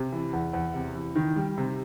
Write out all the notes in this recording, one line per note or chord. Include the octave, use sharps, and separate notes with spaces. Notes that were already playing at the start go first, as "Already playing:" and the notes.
Already playing: C3
E3
E2
E2
C3
E3
D#3
G3
C3